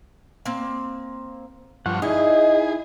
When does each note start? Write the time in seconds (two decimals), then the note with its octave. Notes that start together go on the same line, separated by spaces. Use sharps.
0.45 A#3 C4
1.86 G2 F3 F#5 C#6
2.02 D#4 E4 G#4 D#5